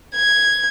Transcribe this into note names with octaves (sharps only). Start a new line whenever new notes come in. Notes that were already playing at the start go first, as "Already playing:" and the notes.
G#6